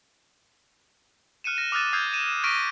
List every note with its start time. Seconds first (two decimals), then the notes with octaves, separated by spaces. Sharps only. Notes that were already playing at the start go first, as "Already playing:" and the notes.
1.44 F6 F#6 C#7 D#7 E7
1.57 F6 A#6 E7
1.72 D6 D#6 F6 F#6 A6 D#7
1.93 D#6 F6 G6 G#6 C7
2.13 D#7 E7
2.44 C#6 F6 A#6 B6 D7 D#7